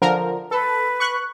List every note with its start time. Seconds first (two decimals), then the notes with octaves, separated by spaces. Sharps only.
0.02 D3 F3 A#4
0.51 A4 B4
1.00 C#6 F#6